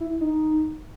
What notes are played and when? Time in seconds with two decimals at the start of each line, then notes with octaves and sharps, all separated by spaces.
0.01 E4
0.21 D#4